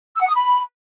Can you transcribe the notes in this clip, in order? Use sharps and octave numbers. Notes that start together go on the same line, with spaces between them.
E6
F#5
D#6
B5